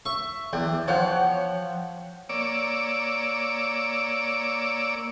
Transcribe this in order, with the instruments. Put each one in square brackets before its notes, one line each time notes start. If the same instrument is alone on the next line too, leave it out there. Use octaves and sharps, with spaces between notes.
[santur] E5 [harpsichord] C#6
[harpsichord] E2 [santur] D5 G5
[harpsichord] F3 [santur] C#5 F#5 G5
[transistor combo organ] A#3 C#5 D5 D6 E6